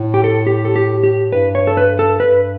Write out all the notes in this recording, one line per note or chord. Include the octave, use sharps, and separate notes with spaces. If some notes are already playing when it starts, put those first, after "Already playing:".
Already playing: A2
G4
A4
G4
A4
G4
G4
G2 B4
C#5
A4
B4
A4
G2 B4